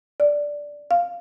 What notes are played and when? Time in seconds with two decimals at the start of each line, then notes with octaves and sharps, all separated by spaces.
0.20 D5
0.91 F5